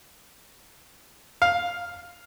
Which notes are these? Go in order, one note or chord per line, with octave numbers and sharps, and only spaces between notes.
F5